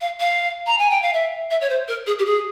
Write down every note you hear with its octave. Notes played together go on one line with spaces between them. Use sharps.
F5
F5
A#5
G#5
G5
F5
E5
E5
C#5
C5
A#4
G#4
G4
G#4